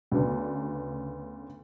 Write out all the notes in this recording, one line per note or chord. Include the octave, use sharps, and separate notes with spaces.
D2 C#3 B3 D4